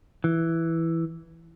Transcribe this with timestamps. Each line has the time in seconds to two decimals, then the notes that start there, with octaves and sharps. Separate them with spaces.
0.24 E3